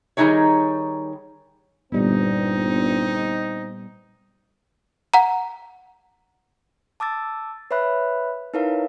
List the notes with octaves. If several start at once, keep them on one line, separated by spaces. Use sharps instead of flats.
D#3 G3 G#3 D#4 G#4 C#5
G1 A#2 G3 B3 C4 D#4
F#5 A#5
A5 D6 E6 A6
B4 C#5 E5 B5 F#6
D#4 E4 A#4 B4 C#5 F5